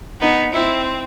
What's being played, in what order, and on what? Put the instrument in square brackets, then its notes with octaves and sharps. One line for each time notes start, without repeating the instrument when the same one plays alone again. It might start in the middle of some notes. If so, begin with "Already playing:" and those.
[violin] B3 [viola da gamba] D#4
[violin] C4 [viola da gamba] E4